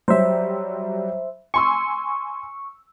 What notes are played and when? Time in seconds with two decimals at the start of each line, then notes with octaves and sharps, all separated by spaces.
0.08 F#3 G3 C5 E5
1.54 G#5 C6 C#6 E6